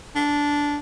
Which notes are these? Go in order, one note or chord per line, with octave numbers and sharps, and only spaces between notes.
D4